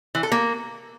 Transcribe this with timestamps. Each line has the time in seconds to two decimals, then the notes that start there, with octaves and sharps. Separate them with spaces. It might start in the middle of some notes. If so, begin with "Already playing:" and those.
0.15 E3
0.23 A4
0.32 A#3